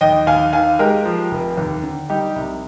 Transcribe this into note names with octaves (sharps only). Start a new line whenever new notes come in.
D#2 D#5 G5
D#2 F5 G#5
D#3 F5 G#5
G#3 G4 A#4
F3
F1
D#2
D3
G3 D#4 G4
C2